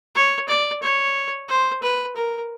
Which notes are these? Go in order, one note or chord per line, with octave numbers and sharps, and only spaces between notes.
C#5
D5
C#5
C5
B4
A#4